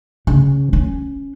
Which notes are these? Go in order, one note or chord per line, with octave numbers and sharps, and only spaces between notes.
C#3
C#4